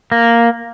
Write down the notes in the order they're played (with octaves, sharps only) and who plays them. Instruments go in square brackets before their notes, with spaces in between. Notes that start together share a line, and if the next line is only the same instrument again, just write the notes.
[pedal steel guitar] A#3